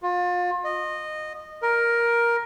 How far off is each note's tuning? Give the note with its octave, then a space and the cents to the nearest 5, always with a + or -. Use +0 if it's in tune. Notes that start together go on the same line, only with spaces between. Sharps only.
F4 +35
D#5 -15
A#4 +10